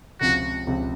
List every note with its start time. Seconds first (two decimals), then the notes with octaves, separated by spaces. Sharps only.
0.20 C#2 C3 F3 F#4
0.67 C#2 C3 F3